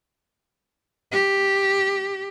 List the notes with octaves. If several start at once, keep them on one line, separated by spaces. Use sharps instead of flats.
G4